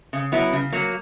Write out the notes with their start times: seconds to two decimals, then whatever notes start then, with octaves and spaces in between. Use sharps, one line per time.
0.13 C#3
0.32 F#3 B3 E4
0.52 C#3
0.72 F#3 A#3